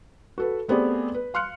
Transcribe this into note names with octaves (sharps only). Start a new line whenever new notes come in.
F#4 A4 B4
A3 B3 C4 G4 G#4 D5
B4
F5 C6 F6 F#6 C#7